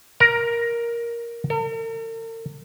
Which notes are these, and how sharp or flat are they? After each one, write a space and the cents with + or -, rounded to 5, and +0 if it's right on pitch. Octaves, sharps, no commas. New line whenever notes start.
A#4 +10
A#4 -45